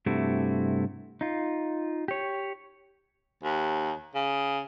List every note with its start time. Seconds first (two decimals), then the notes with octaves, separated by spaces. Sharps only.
0.06 G2 C3 A3 E4 F#4
1.21 D#4 F4
2.08 G4 C#5
3.43 D#2
4.15 C#3